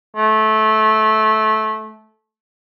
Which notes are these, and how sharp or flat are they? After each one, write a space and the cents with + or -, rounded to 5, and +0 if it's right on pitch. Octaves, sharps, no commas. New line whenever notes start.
A3 -20